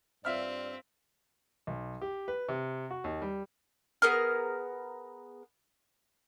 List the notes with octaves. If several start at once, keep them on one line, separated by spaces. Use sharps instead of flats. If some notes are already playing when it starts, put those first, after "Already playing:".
G2 C4 F4 D5 E5 F6
B1
G4
B4
C3
F#4
D#2
G3
B3 G#4 A#4 F6